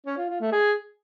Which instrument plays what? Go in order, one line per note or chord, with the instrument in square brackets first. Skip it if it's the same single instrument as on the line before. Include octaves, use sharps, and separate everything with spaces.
[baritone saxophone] C#4
F4
F4
A3
G#4